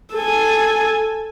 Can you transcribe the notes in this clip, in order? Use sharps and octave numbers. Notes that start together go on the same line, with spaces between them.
A4 G#5